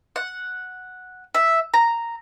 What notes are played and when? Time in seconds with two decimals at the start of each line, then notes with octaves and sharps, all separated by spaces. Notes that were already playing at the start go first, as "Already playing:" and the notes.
0.16 F#5
1.34 E5
1.74 A#5